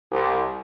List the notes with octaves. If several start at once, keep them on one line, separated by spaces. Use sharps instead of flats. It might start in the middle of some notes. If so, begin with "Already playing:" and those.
C2